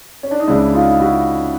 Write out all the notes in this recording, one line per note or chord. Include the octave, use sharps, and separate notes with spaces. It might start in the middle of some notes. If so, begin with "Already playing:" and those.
C#4
D4
D#4
C#2 C#3 E3 D4 E4
D#4 F4
E4 F#4